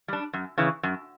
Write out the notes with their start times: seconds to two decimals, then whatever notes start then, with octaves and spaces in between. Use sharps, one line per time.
0.08 G3 D4
0.33 F#2
0.58 C#3 E3
0.83 F#2